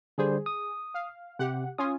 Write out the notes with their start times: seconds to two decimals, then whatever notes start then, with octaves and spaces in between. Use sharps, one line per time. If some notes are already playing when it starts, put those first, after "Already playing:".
0.18 D3 G3 G#4 C5
0.46 D#6
0.94 F5
1.39 C3 G4 F#5
1.78 C#4 F4 G#5 D#6